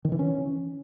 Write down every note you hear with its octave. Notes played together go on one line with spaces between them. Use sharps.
D#3
E3
C#4